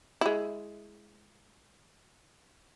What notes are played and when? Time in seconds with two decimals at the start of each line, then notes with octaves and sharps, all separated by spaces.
0.21 G#3 E4